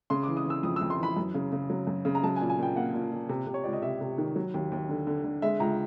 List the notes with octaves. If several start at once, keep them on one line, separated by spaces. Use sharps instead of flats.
C#3 C6
E3 D6
D#6
E3 E6
F2 D#6
E6
F2
C6
E3 B5
F#2
C#3
C#3
F#3
F#2
C#3
A#5
F#3 A5
G#5
A#2
G#5
A#2 G5
A#3 F#5
A#2
A#2
C3
C3
C#5
C#2 D5
D#5
C3 E5
C3
D#3
F#3
D#2
D#2
D3
D3
D3
G#3 E5
C#2 A#5